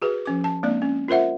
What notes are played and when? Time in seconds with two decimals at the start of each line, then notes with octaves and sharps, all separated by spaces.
0.02 F#4 G#4 B4
0.25 F3 C#4 D6
0.44 A5
0.63 G#3 A#3 C4 D4 D5
0.82 C#4
1.08 F4 A#4 C5 E5 F#5